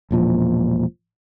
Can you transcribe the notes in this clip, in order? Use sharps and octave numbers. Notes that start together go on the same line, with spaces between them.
E1 A#2 F3